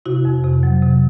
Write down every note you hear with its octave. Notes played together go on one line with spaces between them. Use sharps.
C3 E4 F#4
F2
C3
F#3
C3